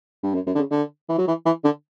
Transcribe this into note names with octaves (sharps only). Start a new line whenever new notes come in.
G2
F#2
F#2
D3
C#3
D3
E3
F#3
E3
E3
D3